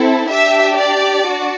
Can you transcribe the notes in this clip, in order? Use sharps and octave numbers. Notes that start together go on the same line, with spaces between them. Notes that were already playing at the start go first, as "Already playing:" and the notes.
Already playing: C4 E4 A4
D4 G4 E5
D5
D4 F#4